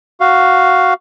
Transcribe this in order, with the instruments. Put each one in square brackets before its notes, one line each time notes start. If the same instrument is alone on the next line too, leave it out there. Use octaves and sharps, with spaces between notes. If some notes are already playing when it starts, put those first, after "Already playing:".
[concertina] F#4 F5